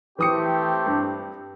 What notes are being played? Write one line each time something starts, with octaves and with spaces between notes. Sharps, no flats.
E3 A3 C4 G4 D#6 C#7
G2